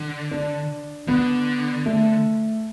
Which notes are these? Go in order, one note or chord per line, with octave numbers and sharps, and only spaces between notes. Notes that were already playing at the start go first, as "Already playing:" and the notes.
Already playing: D3
D4
D3 B3
A3